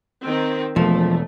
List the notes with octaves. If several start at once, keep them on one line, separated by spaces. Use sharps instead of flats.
D#3 C4
E1 F3 A3